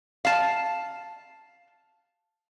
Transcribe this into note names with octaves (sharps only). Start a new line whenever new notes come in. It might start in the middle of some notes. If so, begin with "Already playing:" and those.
F5 A5